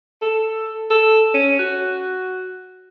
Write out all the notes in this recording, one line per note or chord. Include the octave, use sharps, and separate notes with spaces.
A4
A4
C#4
F#4